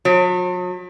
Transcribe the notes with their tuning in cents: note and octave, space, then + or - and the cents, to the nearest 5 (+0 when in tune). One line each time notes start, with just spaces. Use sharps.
F#3 -45